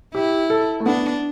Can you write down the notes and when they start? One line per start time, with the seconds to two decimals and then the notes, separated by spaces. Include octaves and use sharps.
0.14 E4 G4
0.50 A4
0.80 A3
0.86 B3 D4